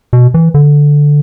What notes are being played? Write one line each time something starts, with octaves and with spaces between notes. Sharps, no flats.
B2
E3
D3